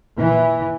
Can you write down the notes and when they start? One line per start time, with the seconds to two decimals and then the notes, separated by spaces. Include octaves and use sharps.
0.17 A#2 E3